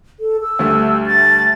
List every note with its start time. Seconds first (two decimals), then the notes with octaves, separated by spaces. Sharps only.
0.20 A4
0.42 E6
0.59 D2 G3 A3
1.06 A6